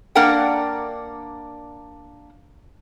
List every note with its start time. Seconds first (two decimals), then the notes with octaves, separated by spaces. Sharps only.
0.15 A#3 D4 A#4 D5 F#5 G5